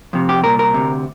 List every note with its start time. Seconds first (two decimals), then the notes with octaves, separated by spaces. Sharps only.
0.13 F2 C3
0.29 G4
0.44 C2 A#2 A#4
0.59 A#4
0.74 D2 C3